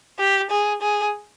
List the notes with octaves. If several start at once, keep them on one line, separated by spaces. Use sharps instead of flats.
G4
G#4
G#4